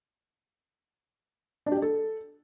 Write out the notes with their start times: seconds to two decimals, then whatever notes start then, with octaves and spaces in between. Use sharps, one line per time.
1.66 D4
1.72 G4
1.77 D4
1.82 A4